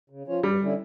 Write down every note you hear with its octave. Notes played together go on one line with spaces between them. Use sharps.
C#3
F3 C#4 F4 C#5
G2 G3
D3 G3 C#4 E4